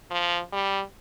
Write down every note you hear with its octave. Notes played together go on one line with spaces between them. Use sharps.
F3
G3